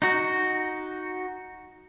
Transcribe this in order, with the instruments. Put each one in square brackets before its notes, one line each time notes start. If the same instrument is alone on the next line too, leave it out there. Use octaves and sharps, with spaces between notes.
[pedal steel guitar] D#4 F#4